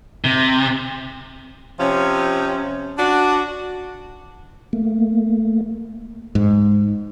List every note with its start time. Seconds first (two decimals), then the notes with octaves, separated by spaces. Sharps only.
0.24 C3
1.80 C3 F3 C#4
2.98 D4 F#4
4.73 A3 A#3
6.35 G#2